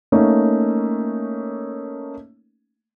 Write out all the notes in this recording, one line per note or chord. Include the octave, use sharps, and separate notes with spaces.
A3 A#3 C#4 D#4